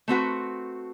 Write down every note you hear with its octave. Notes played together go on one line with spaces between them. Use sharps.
A3 C4 F#4 B4